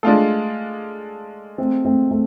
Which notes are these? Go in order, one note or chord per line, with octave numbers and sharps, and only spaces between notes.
G#3 A3 D4 F4 A4
A3 C4
A3 C4
A3 C4